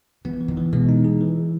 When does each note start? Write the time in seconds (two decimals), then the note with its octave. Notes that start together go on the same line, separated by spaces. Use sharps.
0.25 E3 B3
0.41 E3
0.48 D#3
0.57 E3
0.73 B2 G#3
0.89 D#4
1.05 G#4
1.21 E3